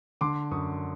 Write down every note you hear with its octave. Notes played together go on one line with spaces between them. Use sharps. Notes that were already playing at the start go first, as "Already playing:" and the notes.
D3 C6 D6
F#2 C#6 D#6